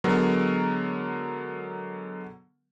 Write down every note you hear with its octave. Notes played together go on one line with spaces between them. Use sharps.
D3 F#3 G#3 B3 A#4